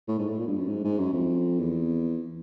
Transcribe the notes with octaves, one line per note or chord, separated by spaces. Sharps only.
A2
G#2
A2
A#2
G2
F#2
G#2
G#2
F#2
F2
E2